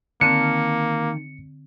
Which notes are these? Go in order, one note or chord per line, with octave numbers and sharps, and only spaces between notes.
D3 D#3 A#3 C4 A5 F6 C#7